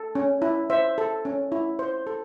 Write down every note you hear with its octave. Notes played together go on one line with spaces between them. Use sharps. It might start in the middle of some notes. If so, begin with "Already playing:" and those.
Already playing: A4
C#4
E4
C5 E5
A4
C#4
E4
C5
A4